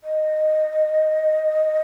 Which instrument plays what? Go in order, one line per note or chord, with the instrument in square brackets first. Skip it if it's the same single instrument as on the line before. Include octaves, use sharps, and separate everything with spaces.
[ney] D#5